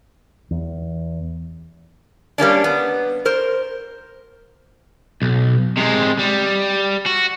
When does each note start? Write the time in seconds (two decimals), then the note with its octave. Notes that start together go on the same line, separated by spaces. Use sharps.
0.51 E2
2.38 G3 A#3 C#4 D4
2.64 B3
3.25 A#4 C5
5.22 B1
5.77 C3 G#3
6.19 G3
7.06 F#4